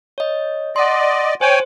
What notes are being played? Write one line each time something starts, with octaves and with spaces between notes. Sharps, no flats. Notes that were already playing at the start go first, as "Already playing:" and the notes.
C#5 D#5
D5 D#5 F#5 C6
C5 C#5 G5 G#5